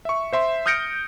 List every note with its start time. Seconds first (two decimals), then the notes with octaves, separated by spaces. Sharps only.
0.05 E5 C#6
0.33 C5 E5 C6
0.66 D#6 F6 G6 A#6 C#7 D7